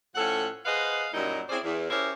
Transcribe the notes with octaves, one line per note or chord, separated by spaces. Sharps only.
A2 F3 C#4 A4 F#5
G#4 B4 C5 D#5 F5 F#5
F#2 A#2 F#3 G3 D#4 E4
C4 C#4 E4 G#4 C5 D5
E2
C#4 E4 G4 A#4 C5